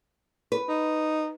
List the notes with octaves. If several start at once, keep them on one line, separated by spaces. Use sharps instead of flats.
B4
D#4